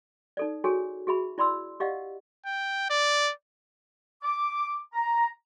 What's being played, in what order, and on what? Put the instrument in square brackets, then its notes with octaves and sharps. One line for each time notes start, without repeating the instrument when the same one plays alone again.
[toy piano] D#4 A4 D5
F#4 G#4 A4 C#5 G#5
F#4 G#4 E5 B5
E4 D5 B5 C6 E6
G4 D5 D#5 F5 F#5
[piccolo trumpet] G5
D5
[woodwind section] D6
A#5